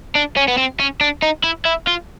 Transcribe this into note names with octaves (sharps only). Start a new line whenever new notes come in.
D4
C#4
B3
C4
C#4
D4
D#4
E4
E4
F4